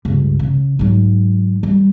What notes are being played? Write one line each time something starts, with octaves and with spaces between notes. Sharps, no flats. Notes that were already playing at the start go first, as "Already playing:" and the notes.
C#2 G2
C#3
G#2 F#3
G3